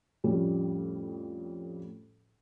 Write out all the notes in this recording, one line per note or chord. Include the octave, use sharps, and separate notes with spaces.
F2 A2 G3 C#4